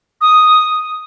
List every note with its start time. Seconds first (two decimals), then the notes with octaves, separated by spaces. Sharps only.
0.21 D#6